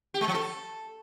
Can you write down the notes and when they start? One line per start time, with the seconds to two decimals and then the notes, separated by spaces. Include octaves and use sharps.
0.14 G4
0.21 G#3
0.28 F3
0.34 A4